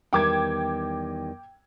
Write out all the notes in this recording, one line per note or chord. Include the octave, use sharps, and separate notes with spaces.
E2 D#3 G3 G5 D6 G#6